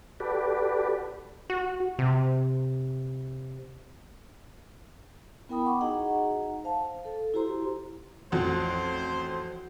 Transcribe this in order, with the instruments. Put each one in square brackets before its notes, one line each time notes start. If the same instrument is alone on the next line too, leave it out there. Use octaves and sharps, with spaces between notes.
[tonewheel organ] F#4 G4 A4 B4 D5
[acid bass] F#4
C3
[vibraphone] B3 E4 A#4 G5 B5 D#6
F#5 C#6 D6
D#4 F#4 G#4 D#5 F#5 A#5
C5 F5 A5
A4
E4 F#4 G4 C5 A#5 C6
[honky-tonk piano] A1 F2 F3 [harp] F#4 [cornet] C5